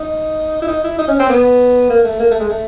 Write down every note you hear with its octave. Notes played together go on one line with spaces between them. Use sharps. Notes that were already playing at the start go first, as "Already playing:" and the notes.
Already playing: D#4
E4
D#4
E4
D#4
C#4
C4
B3
A#3
A3
A#3
A3
G#3
A3